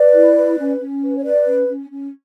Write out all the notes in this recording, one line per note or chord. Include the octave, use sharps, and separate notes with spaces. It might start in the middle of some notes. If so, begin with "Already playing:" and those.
Already playing: B4 D5
E4
B4
C#4
C#4
B4
C#5
B4 D5
C#4
C#4
C#4